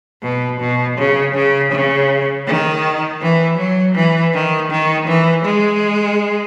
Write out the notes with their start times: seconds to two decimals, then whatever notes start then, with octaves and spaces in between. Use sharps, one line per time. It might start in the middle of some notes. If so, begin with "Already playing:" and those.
0.23 B2
0.60 B2
0.98 C#3
1.35 C#3
1.72 C#3
2.47 D#3
3.22 E3
3.58 F#3
3.95 E3
4.34 D#3
4.71 D#3
5.07 E3
5.45 G#3